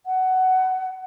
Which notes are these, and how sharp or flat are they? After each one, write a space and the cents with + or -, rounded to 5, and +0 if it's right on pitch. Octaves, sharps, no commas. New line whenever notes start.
F#5 +15